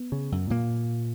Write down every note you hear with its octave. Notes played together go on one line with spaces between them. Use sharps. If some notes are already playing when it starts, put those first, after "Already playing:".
Already playing: B3
C#3
F#2
A#2 A#3